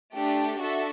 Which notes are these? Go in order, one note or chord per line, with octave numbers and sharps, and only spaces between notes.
A3 D4 G4
D4 F#4 A4 E5